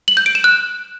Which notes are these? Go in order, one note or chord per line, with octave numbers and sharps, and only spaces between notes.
F#7
G6
D7
E7
F#6